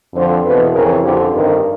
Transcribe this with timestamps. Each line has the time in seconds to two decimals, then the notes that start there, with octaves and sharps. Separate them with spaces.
0.14 F2 D3 F3 C5
0.44 E2 B2 B4
0.73 F2 C#3 E3 A#4
1.03 F2 D3 F3 G4
1.33 G2 D#3